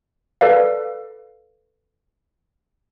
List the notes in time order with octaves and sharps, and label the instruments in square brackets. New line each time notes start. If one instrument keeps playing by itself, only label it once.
[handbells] A4 B4 D5 F5